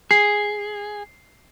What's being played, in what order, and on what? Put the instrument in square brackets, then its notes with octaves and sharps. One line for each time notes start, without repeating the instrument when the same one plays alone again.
[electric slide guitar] G#4 [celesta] C7